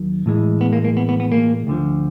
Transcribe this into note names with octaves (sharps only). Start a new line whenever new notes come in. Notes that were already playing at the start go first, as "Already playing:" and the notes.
Already playing: D#2 D#3 F#3
A2 E3 G#3
B3
A#3
A#3
B3
B3
B3
A#3
D2 D3 F3